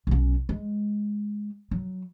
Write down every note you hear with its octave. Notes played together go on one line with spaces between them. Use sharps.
B1 C#4
G#3
F#3